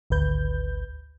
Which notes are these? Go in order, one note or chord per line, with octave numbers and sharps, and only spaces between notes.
G#1 D2 B4 G6